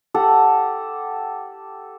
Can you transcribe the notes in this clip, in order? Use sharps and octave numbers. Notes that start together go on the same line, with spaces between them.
G4 A4 F#5